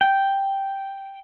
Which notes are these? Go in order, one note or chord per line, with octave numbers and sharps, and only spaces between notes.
G5